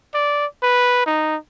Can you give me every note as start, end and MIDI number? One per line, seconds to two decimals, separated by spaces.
0.14 0.46 74
0.63 1.01 71
1.06 1.36 63